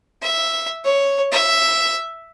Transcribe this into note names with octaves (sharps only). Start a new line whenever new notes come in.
E5
C#5
E5